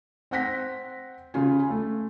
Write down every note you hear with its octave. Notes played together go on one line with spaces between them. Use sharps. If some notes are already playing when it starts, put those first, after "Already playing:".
C4 F#5 A#6 B6
C#3 F4 G#5
A3